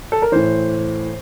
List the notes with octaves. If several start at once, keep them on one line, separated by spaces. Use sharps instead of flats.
A4
A#4
A2 E3 C5